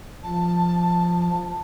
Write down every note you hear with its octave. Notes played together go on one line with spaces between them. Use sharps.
F3 A5